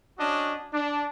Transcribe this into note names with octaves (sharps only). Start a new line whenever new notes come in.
C#4 D4 F#4 D#5
D4